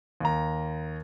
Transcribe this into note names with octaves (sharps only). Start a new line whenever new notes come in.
D#2 A#5